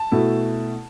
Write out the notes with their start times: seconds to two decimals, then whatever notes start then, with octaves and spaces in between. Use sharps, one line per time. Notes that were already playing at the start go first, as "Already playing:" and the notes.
Already playing: A5
0.12 B2 A3 E4